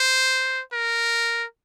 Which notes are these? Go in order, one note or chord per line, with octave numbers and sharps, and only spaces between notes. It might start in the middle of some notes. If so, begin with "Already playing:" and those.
Already playing: C5
A#4